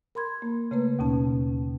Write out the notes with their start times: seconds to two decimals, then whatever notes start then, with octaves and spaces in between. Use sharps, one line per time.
0.15 A#4 B5 C6 G#6
0.42 A#3
0.71 C#3 A3 A#3 B4
0.99 D#2 B2 C#4 A5